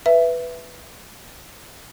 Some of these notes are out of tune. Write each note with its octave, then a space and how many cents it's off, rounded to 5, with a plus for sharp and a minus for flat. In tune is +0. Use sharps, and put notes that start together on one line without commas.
B4 +0 E5 +10